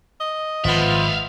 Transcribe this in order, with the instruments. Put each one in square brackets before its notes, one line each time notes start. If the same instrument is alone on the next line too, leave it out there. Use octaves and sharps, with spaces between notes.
[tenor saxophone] D#5
[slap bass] G#1 [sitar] F3 B3 [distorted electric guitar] E5 F5